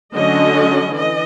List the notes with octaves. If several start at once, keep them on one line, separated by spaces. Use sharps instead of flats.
D3 F#3 A3 C#4 D#5
E3 D#5